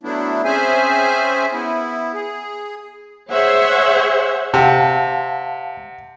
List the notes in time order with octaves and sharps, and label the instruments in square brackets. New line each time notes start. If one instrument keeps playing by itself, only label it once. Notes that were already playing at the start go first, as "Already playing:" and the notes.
[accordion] F#3 A3 B3 D4 E4
C4 C#4 G#4 C5 E5 G#5
B3 E4
G#4
[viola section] G#4 C5 C#5 E5 F#5
[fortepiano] C3 [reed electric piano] F5 F#5 A5